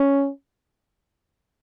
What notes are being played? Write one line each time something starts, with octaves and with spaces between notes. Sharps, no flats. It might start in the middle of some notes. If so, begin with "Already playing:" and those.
Already playing: C#4